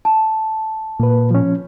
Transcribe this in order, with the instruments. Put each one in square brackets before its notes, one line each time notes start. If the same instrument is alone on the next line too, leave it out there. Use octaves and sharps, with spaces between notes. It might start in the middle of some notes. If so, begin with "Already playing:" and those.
[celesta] A5
[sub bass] A#2 [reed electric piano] A#3 B4
[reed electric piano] F3 C#4